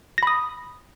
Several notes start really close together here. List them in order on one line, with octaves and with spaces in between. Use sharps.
A#6 B5 D#6